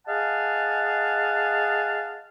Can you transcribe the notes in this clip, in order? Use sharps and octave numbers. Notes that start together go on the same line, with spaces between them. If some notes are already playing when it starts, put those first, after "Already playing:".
G#4 D#5 F5 F#5 A5